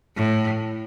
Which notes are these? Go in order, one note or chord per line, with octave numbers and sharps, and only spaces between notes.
A2